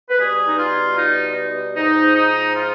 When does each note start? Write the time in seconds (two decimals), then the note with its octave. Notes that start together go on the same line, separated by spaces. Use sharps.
0.10 B4
0.19 B2 G3 G#4
0.47 D#4
0.58 F4
0.98 D#4
1.76 G#2 F3 D#4
2.15 D#4
2.55 F4